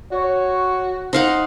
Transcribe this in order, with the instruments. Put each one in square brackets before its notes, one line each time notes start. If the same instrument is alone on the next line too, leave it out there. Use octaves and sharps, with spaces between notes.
[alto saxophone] F#4 [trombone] C#5
[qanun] D#4 F5 F#5 [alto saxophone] C5